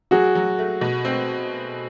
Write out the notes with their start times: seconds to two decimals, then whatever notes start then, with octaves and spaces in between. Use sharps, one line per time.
0.11 F#3 F#4 G#4
0.35 F#3
0.58 A3
0.81 B2
1.05 C4